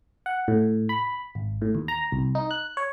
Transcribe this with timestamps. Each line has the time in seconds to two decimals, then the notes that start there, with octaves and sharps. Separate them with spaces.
0.26 F#5
0.48 A2
0.89 B5
1.35 G#1
1.62 A2
1.75 D#2
1.88 A#5
2.12 C2
2.35 D#4
2.51 F#6
2.77 C#5